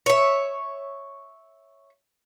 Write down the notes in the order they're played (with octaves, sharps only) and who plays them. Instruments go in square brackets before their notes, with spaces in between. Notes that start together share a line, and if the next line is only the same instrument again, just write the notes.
[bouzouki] C#5 E5